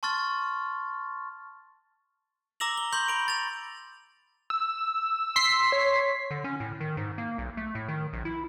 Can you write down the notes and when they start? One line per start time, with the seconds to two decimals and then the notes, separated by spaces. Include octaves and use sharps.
0.03 A5 C6 C#6 F6 A6
2.60 A#5 D6 E6 A#6 F7 F#7
2.77 G7
2.93 C6 C#6 G6 F#7
3.08 B5 D7
3.28 A6 F7
4.50 E6
5.36 C6 B6 C7
5.72 C#5
6.31 D3
6.44 C#4
6.60 A2
6.80 D#3
6.97 G#2
7.18 A#3
7.38 B1
7.57 A3
7.75 A2
7.88 D#3
8.13 A#1
8.25 E4